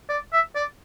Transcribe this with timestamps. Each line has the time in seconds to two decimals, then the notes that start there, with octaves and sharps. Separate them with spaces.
0.09 D5
0.33 E5
0.56 D5